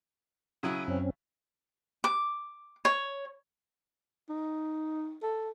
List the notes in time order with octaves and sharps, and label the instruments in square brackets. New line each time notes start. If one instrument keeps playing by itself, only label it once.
[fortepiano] C#3 F#3 E4 [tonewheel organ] D#6
[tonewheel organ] F#2 C4 C#4
[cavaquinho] D6
C#5
[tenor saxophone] D#4
A4